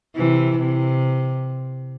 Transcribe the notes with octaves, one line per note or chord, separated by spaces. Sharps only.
C3 E3
C3